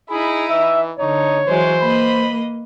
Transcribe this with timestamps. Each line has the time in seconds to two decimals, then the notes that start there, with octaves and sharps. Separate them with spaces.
0.10 D#4 E4 G#4 B5
0.50 E3 E5
1.00 D3 D#4 C#5
1.48 E3 F#3 G#3 C5
1.83 A#3 B4 D#5 B5